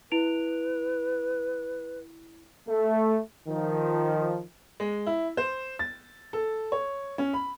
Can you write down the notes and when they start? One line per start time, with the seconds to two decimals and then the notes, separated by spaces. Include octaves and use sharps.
0.12 E4 B4 D7 F7
2.68 A3
3.48 D#3 F3
4.80 G#3
5.07 E4
5.37 C5
5.79 A6
6.33 A4
6.72 C#5
7.18 C#4
7.33 B5